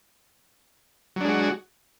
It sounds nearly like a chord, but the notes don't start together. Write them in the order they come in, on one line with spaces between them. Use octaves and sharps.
F#3 D4 G#3 F#4